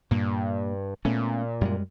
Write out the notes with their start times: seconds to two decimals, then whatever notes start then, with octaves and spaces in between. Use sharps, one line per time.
0.11 G2 A#2 A#3
1.05 A#2 A3 B3 C#4
1.61 F#2 G3 G#3